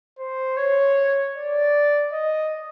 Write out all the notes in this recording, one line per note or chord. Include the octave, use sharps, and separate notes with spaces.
C5
C#5
D5
D#5